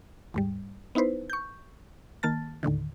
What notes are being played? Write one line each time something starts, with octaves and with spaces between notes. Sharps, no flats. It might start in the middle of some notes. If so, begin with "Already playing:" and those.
D#2 G#2 G3
B3 D#4 E4 B4 C5
C#6 G6
D#3 A#3 A5 F6 A6
D#2 A2 D3 D#3